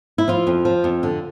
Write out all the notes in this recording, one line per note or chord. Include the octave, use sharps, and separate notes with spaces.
E4
F3 F4
F2
F3
F2
D3